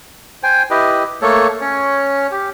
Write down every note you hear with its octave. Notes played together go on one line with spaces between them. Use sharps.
C5 G5 G#5
E4 G4 B4 D#5
A3 A#3 A4 C#5
C#4 C#5
G4